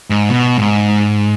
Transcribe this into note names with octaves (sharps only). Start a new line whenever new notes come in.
G#2
B2
G#2